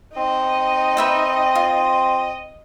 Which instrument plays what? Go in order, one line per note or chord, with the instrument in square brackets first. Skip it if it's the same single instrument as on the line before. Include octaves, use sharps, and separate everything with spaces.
[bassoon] C4 [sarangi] D#4 [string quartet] D#5
[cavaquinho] B4 E5 G5
F4